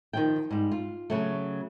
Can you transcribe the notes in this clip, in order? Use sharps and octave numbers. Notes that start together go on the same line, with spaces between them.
D#3 F3 G5
G#2 G3
F4
C#3 F#3 A3